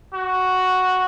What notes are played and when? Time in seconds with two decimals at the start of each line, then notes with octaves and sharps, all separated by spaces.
0.14 F#4